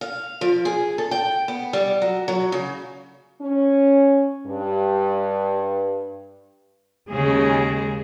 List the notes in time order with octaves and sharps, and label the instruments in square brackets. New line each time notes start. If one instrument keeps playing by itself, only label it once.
[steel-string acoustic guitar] F5
F3
G#4
A4
G5
B3
G3
F#3
F#3
C#3
[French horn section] C#4
G2
[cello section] D#2 C#3 G#3 G#4